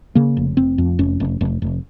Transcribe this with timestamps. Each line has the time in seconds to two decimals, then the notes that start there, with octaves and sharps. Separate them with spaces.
0.15 C#3 A#3
0.37 F1
0.57 F1 C4
0.78 F2
0.99 F1 C#4
1.20 F1
1.41 F1
1.62 F1